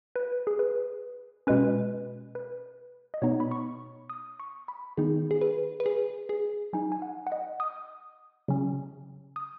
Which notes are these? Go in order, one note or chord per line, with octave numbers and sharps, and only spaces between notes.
B4
G#4
B4
B2 G#3 C#4 B4
B4
D#5
B2 B3 D#4 C#5
B5
C#6
D#6
C#6
B5
D#3 B3 D#4 G#4
G#4
B4
B4
G#4
G#4
F#3 D#4 G#5
G#5
F#5
F#5
D#5
D#6
C#3 F#3 C#4
D#6